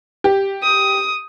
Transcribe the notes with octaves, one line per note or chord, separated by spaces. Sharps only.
G4
D#6